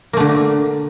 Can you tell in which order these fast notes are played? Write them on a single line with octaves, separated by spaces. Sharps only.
A#3 A3 D3